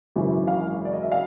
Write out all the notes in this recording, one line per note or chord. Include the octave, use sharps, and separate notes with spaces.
G#1 F#2 C#3 E3
F5
D5
D#5
E5
F5